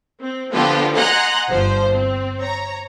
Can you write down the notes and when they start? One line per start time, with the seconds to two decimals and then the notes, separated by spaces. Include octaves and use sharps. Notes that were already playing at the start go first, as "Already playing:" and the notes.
0.19 C4
0.52 D3 F3 B3 F4 G4 A4
0.96 D#5 F#5 G#5 A#5 C6 F#6
1.50 G1 F3 C5
1.94 C4
2.40 C#5 A#5